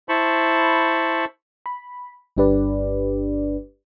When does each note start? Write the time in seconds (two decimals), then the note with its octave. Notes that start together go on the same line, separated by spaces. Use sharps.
0.09 E4 C5 A5 B5 C#6
1.66 B5
2.37 G1 G2 D4 G4 B4 D5